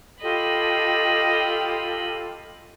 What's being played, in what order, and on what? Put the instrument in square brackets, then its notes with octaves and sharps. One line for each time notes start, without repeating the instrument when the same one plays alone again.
[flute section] F4 G4 A4 [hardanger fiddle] D#5 B5